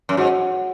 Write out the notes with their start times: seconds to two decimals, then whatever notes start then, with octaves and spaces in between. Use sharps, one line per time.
0.09 F#2
0.17 G#2 F#4 C#5 F#5